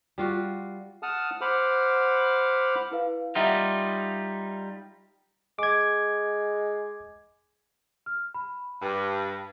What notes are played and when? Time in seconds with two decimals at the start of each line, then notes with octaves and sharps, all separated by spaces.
0.18 G3 F4 F#4
1.03 F#5 A5 D#6 F6
1.41 C5 F#5 B5 D6 F6
2.91 E4 B4 F5
3.35 G3 D#4 F4 E5 F#5
5.59 G#3 D6 G#6
8.06 F6
8.34 B5
8.82 G2